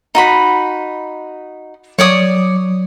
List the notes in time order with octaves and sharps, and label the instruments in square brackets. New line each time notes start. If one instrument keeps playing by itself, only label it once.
[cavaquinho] D#4 F#4 B5
[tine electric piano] F#3 [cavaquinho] C#5 D5 D#6